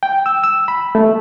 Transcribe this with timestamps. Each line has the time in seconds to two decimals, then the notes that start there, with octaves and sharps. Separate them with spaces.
0.03 G5
0.26 E6
0.44 E6
0.68 B5
0.95 A3